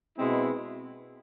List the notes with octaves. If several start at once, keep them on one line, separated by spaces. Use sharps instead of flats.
B2 G#3 C4 E4